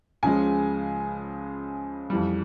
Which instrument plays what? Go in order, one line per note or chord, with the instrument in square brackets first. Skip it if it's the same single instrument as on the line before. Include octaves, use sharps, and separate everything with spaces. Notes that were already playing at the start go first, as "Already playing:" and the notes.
[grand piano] C#2 C#3 F3 G#3 G#5
F2 E3 G3